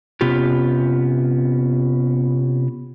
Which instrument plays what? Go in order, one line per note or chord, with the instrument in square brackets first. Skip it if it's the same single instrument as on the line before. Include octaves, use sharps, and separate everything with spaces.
[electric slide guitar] C3 B3 C#4 F4 G4